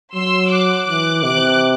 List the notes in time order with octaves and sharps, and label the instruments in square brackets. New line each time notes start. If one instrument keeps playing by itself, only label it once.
[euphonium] F#3 [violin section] C6 E6
[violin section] D6 F#6
[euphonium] E3 [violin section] D6 F#6
[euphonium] C3 [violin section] D6 F#6